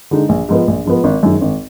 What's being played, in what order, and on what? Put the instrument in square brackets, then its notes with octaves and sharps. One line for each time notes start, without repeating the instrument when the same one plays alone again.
[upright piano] D3 G#3 D#4
A#1
G#2 F3 B3
A#1
G#2 F3 B3
G#1
F#2 D#3 G#3
G#1